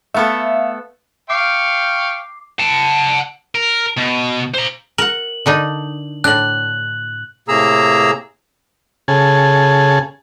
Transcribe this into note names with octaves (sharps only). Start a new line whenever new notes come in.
A3 B3 A4 E5 F5
F5 G5 C#6 D6 C7
F#5 A5
A#4
B2
C5 A#5
A#4 F#5 F#7
D3 D4 D#4
A2 D4 F#6 F#7
A2 C3 A#3 G#4 A#5 E6
C#3 G#4 A4